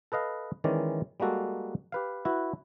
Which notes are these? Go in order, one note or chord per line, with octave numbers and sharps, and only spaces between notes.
A4 B4 D#5 F5
D#3 E3 G#3 C#4 D5
G3 G#3 A#3 F#4 A4
G4 B4 F5
E4 F#4 B4